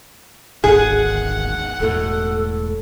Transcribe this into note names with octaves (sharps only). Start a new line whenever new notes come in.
D1 G#1 D#2 G#4 F#5
E1 A2 A4